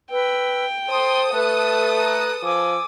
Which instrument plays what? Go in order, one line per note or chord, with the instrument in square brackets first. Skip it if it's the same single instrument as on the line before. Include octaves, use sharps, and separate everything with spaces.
[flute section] B4 E6 [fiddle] G5
[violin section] A4 D#6 [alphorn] C5 [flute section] C6
[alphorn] A3 [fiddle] B4 [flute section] F#6
[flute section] A#5 F#6
[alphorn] F3 [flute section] G#5 D6 E6